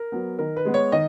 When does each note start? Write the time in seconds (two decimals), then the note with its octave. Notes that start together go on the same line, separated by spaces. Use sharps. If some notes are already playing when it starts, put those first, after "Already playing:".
Already playing: A#4
0.12 F#3 B3
0.39 D#3 A#4
0.56 B4
0.65 G#3 B3
0.74 C#5
0.92 D#3 D#5